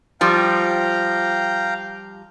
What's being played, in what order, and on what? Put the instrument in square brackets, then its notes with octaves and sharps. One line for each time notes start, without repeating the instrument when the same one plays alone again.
[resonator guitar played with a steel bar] F3 G3 [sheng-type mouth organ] F5 G5 A#5